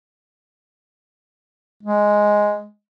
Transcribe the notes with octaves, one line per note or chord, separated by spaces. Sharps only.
G#3